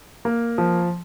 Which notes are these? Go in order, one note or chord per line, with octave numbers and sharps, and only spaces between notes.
A#3
F3